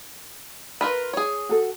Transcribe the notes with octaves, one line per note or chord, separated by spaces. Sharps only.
F4 A#4 B4
G#4 C#5
F#4 A4